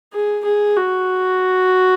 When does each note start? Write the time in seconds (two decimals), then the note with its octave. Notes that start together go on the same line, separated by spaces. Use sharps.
0.13 G#4
0.45 G#4
0.77 F#4